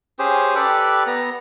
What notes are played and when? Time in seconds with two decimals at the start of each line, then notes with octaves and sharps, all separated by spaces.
0.19 C#4 G4 G#4 C5
0.55 G4 A4 B4 D5
1.07 B3 A#5